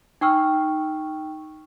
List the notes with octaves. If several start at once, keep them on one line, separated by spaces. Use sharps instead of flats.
D#4 G5 C#6 E6 F6